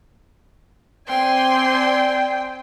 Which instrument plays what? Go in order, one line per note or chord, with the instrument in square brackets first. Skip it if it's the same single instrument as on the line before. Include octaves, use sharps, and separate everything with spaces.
[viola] C4 G#5 [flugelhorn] D5 [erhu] G5 [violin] C6